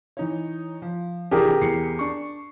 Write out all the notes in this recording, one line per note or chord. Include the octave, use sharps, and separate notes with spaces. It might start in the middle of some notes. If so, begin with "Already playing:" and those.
E3 D#4 C#5
F3
C3 E3 D4 G4 G#4 A#4
E2 C7 C#7
D4 C#6